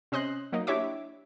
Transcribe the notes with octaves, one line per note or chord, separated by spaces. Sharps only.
C3 C#4 D#5 C6 F#6
F#3 A#3 D#4
D4 E4 G4 C#5 E5 D6